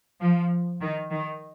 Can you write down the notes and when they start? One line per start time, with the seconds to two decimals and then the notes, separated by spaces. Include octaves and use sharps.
0.21 F3
0.81 D#3
1.10 D#3